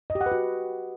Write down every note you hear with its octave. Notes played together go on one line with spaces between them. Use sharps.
D#5
G4
F#5
B4
F#4